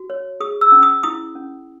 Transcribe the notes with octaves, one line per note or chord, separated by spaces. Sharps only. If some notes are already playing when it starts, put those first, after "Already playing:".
Already playing: F#4
C#5
G#4 D#6
E6
C#4
D#6
E4 D#6
C#4